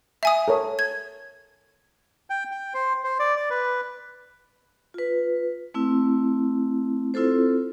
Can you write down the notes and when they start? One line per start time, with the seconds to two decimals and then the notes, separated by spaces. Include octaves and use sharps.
0.23 E5 G#5 D#6
0.48 A4 A#4 C#5
0.79 G#6
2.30 G5
2.52 G5
2.74 C5
3.04 C5
3.19 D5
3.36 D5
3.50 B4
4.94 F4 B4
5.74 A3 C4 E4
7.14 C4 E4 F4 A4 C5